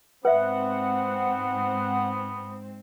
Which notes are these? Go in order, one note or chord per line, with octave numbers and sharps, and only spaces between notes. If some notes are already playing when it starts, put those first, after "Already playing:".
G#2 B3 C4 B4 E5 F#5